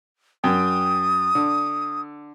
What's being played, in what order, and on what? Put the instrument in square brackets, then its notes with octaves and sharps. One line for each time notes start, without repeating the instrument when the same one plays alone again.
[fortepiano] F#2 G5 [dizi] D#6
[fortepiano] D3